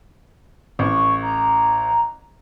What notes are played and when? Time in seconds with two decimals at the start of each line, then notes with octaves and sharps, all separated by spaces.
0.79 A1 C#6
1.22 A#5